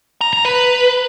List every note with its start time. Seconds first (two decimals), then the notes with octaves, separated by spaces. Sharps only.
0.21 A#5
0.33 A#5
0.45 B4